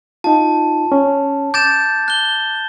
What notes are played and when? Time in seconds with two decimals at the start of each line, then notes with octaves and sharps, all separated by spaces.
0.24 D#4 F4 A5
0.92 C#4
1.54 D6 G6 A6 E7
2.08 F#6 G7